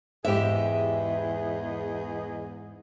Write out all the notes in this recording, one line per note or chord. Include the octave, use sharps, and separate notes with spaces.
E2 G#2 G4 G#4 D#5 E5